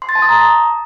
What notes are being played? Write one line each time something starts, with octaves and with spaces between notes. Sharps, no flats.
C6
A6
A5
D#6
A#5